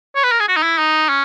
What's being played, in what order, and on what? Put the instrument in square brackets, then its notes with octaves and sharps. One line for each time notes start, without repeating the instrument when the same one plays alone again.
[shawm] C#5
B4
A#4
G#4
F#4
D#4
E4
D#4
C#4